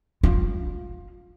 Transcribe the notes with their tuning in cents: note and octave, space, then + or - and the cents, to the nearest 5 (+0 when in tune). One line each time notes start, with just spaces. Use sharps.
F4 +20